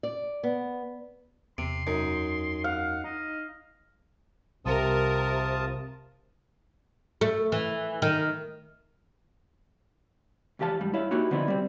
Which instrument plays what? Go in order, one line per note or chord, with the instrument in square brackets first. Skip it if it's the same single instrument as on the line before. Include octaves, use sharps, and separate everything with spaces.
[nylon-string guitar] D5
B3
[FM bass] E2 [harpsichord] C3 [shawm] C6
[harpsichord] F#2 [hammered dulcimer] D#4
[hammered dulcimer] F5 [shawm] F#5
[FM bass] D#4 [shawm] D#5
[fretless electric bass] C2 [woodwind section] C3 [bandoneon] F4 A5 D#6 [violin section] A#4
[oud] A3
E3
D#3
[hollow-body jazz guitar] F2 E3 G4 F5 A5
G#2 G3
E4 C#5 E5 F5
A#3 D#4 E4 F#4 G4
D3 F3 B3 C4 D#4 E4
G3 C4